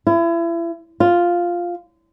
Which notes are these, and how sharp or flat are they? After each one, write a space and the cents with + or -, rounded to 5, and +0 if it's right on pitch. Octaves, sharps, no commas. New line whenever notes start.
E4 +35
F4 +0